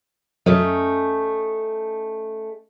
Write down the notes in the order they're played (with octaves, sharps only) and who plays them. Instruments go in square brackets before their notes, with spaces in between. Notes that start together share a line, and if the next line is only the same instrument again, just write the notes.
[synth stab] F#2 [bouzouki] A3 C#4 D#4